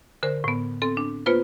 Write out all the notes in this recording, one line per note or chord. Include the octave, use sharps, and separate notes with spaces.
D3 A#4 C5
A2 B3
C4 A4
D4
A#3 B3 F4 B4 C5